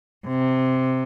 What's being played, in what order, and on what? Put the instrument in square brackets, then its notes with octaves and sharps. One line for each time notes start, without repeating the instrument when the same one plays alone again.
[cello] C3